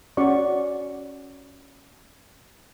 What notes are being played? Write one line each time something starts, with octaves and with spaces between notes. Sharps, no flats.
C#4 F#4 D5 C#6